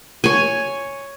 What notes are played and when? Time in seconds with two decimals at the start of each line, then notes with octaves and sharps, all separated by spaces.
0.24 C#5 G#5